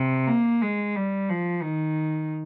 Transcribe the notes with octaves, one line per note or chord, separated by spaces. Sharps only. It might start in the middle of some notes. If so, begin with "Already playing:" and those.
Already playing: C3
A#3
G#3
G3
F3
D#3